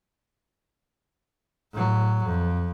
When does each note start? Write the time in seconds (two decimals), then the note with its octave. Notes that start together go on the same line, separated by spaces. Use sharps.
1.72 A2 F#3
2.24 F2